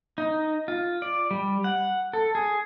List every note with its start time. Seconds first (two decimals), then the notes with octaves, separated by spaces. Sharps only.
0.18 D#4
0.68 F4
1.02 D5
1.31 G3
1.64 F#5
2.13 A4
2.35 G#4